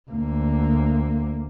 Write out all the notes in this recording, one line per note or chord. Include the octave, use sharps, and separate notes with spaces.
D2 A#3